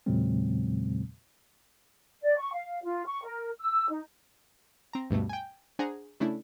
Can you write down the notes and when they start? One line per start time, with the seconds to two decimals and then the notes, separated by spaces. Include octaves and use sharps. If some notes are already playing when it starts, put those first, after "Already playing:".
0.06 E2 A#2 C#3 F#3 G#3 C4
2.22 D5
2.39 C#6
2.53 F5
2.84 F4
3.06 C#6
3.24 A#4
3.59 E6
3.89 D#4
4.93 C4 A#5
5.10 D2 G2 B2 A3
5.29 G5 G#5
5.79 D4 G#4 C5 F#5 A#5
6.20 C#3 A3 D4 E4